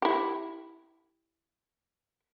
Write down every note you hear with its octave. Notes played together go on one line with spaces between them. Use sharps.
E4 G4